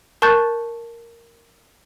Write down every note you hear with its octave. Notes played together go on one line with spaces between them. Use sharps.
A#4 A5 C#6 F#6 G6 A6